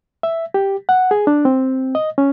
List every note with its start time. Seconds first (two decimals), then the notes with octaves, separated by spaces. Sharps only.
0.23 E5
0.54 G4
0.89 F#5
1.11 G#4
1.27 D4
1.45 C4
1.95 D#5
2.18 C#4